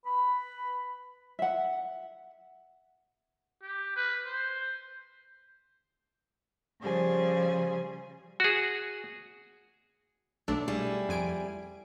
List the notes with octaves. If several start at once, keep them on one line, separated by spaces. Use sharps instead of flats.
B4 B5
E5 F#5
G4
B4
C5
C#3 F3 G3 G#4 C5
F#4 G#4
B1 A3 D4 E6
G3 E4 G#4
F2 G#5 D7